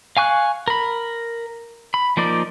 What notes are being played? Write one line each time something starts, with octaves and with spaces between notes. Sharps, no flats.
F5 G#5 C#6 F#6
A#4 B5
B5
F3 A#3 D#4 D5